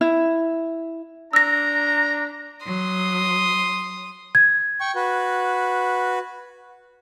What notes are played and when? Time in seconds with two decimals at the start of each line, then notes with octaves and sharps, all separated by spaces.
0.01 E4
1.33 D4 A#5 E6 A#6
2.66 F#3 C6 D#6
4.35 G#6
4.81 G5 C#6
4.96 F#4 B4